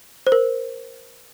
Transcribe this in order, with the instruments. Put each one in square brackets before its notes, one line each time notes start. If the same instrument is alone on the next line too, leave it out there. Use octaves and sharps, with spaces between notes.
[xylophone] C5
A#4